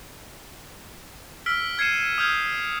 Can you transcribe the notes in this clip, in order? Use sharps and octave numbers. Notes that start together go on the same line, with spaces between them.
E6 F6 B6 D7 G7
F6 G#6 C7 C#7 D#7 E7
D#6 F6 G6 G#6